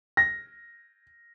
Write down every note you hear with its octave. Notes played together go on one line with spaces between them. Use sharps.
A#6